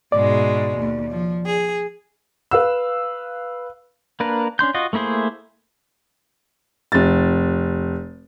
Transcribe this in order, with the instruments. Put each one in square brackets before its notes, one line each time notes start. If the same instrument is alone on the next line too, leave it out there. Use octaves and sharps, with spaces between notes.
[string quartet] G#2 B2 G#3 [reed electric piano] D5
[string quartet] D#2
F3
G#4
[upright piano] B4 F5 E6
[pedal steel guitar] A#3 D4 A#4 B4
C#4 D4 C6 G6
F4 F#4 D#5
A3 A#3 E4 G#4 C5
[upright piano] F1 A6